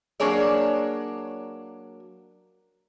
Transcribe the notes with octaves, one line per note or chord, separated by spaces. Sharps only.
F#3 A#3 D4 G#4 C#5 D5